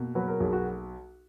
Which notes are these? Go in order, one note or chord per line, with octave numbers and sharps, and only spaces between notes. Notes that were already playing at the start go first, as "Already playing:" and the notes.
Already playing: B2 A#3
F#3 B4
A#4
B1 G#4
F#4